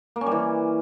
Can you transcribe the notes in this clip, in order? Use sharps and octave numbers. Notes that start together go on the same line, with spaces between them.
A#3
C#4
G3
E3